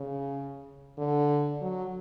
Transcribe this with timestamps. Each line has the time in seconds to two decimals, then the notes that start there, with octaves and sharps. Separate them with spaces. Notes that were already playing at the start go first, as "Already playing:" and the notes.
Already playing: C#3
0.98 D3
1.61 F#3